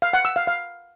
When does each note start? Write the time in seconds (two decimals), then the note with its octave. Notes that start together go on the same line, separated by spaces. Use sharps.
0.02 F5
0.13 F#5
0.25 E6
0.36 F5
0.47 F5